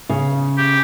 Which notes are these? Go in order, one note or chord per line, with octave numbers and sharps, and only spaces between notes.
C#3
G4